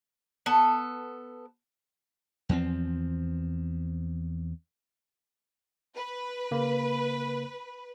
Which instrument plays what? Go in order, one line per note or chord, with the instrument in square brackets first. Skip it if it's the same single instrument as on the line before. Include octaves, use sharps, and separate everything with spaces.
[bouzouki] B3 A4
[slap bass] E2 F3 C4
[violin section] B4
[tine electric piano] C#3 A#3